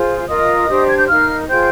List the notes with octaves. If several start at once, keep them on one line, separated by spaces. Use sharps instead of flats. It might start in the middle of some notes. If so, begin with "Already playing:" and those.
Already playing: F4 G#4 C5
F4 A#4 D#5 D#6
D4 G4 C5
G#6
G6
D#4 A#4 F5 F6
F4 G#4 C5 G5 G6